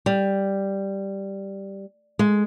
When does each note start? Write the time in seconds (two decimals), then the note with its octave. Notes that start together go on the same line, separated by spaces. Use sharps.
0.06 G3
2.19 G#3